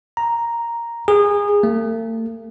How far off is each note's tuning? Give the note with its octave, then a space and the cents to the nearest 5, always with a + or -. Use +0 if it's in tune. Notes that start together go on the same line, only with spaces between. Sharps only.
A#5 +0
G#4 -25
A3 +45